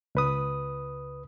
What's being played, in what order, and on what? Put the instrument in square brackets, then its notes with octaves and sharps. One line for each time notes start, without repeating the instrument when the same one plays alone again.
[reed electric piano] C#2 B4 D#6